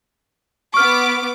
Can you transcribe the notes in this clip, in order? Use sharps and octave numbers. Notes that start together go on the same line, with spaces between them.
B3 C#6 D6 F6